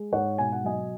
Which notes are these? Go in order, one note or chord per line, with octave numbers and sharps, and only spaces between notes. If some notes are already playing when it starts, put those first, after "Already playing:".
Already playing: G#3
G#2 C#5 F#5
B2 G#5
F#5
F#3 D#5 G#5